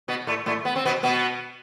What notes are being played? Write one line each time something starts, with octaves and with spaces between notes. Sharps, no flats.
B2 B3
A2 A3
A2 A3
B3
C4
B2 B3
B2 B3